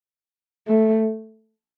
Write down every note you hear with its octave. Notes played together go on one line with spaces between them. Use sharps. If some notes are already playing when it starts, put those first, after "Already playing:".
A3